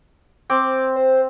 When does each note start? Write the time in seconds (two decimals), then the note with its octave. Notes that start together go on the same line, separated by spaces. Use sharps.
0.50 C4 D6
0.96 C5